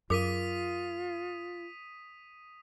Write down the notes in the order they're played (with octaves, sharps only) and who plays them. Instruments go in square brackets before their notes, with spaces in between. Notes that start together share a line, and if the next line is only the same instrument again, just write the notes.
[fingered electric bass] F#2 [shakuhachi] F4 [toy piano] G#4 A#4 D6 [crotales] D#6 B6 D#7